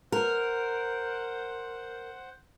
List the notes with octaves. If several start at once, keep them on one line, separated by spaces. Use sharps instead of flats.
A#4 C5 F#5